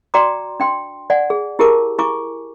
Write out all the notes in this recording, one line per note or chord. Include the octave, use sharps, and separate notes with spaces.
F#4 D5 G5 A#5 C6 D6
D4 G5 C6
D5 F#5 G#5
G#4
E4 G4 G#4 A#4 A5 D6
E4 G#5 C#6 D6